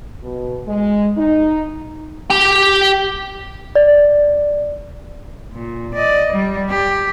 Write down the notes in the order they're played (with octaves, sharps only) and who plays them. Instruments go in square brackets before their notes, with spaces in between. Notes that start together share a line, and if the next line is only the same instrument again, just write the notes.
[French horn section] B2
G#3
D#4
[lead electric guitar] G4 G5
[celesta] D5
[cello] A#2
D5 D#5
G3
G4